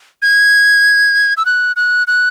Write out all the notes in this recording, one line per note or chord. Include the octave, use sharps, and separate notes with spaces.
G#6
E6
F#6
F#6
F#6